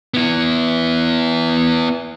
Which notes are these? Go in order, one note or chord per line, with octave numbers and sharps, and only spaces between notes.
B3 E4